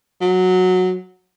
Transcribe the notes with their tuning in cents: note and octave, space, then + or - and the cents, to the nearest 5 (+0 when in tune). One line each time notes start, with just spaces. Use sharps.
F#3 -10